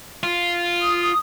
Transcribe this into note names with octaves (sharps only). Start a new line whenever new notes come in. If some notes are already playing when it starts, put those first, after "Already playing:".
F4
D#6